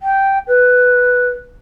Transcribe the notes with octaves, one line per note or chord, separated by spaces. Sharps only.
G5
B4